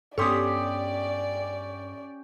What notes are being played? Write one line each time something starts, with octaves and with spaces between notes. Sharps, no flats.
G2 B3 C#4 G4 A4 D5 C6 D#6